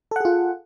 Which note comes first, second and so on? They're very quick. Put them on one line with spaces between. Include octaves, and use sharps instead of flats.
A4 F#5 G#4 F4